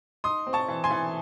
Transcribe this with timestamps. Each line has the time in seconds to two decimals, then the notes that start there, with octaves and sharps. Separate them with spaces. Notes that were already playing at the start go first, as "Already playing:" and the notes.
0.24 D#4 C6 D#6
0.47 C4
0.53 A5 C#6
0.68 E3
0.84 G#5 C6
0.91 E3